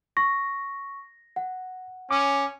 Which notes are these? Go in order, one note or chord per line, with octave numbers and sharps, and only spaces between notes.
C#6 A#6
F#5
C#4 D6